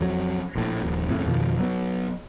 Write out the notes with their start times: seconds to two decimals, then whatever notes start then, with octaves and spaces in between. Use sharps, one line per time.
0.01 F2 F#3
0.56 A#1 A2
0.83 D#1 A#1
1.09 F2 A2 C#3
1.26 F2 B2 D#3 F3
1.59 F#3 A#3 B3